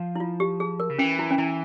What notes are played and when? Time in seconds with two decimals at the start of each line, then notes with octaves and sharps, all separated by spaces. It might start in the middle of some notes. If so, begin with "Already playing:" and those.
Already playing: F3
0.16 E4
0.20 F4
0.40 G4
0.60 G#4
0.80 A#4
0.90 C#3
0.98 E3 C#4
1.19 E4
1.31 C#4
1.38 E3 E4